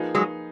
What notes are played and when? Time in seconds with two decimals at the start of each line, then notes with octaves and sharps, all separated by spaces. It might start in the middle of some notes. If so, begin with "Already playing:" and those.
Already playing: F3 A#3 D#4 G#4 B4
0.15 F#3 G#3